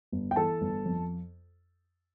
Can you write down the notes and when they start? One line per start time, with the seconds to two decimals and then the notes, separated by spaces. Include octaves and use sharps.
0.12 G1
0.31 G5
0.36 E3 A4 A5
0.61 G1
0.85 F2